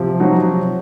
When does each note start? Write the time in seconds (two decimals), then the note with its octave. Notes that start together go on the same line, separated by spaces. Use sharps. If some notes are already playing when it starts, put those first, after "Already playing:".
Already playing: C3 F3
0.20 F#3 D#4 F#4
0.45 C3